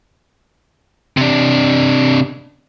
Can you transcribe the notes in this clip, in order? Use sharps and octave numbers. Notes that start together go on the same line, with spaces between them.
C3 D4